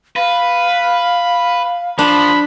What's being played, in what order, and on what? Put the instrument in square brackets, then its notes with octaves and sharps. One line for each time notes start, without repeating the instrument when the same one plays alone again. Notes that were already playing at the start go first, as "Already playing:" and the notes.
[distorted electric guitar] B4 [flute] F5
[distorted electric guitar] F3 [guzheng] D4 [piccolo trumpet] B5